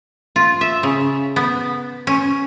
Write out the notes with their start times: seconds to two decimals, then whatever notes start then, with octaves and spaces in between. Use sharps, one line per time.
0.36 F4
0.61 E5
0.83 C#3
1.36 B3
2.07 C#4